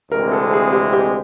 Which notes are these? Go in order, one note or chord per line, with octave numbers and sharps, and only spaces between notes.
D2 C3 E3 G#3 C4 A#4
A4
G#4
G4
G4